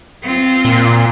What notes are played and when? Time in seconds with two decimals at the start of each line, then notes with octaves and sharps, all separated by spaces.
0.23 C4 F4
0.65 A#2